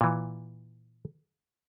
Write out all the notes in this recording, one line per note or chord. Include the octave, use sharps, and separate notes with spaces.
A#2 E3